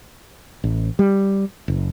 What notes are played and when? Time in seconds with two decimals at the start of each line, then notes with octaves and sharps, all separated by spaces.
0.64 A1
0.99 G3
1.68 F#1